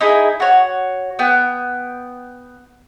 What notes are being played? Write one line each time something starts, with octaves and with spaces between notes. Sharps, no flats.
D#4 E4 G#4
F#4 C#5
B3 G5